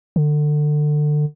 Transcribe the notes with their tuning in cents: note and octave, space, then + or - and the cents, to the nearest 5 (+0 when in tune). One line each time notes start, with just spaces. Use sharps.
D3 +25